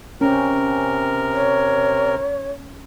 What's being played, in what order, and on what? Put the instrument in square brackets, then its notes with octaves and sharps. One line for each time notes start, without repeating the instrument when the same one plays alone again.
[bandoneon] C3 A#4 [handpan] C#4 [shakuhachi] G5
[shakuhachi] C#5